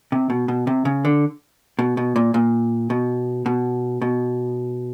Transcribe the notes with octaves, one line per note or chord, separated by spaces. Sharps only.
C3
B2
B2
C3
C#3
D3
B2
B2
A#2
A#2
B2
B2
B2